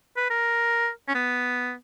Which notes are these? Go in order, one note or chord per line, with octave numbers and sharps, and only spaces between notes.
B4
A#4
C#4
B3